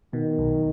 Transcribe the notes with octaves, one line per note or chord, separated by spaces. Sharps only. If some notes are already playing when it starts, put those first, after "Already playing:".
B2 D#3
B1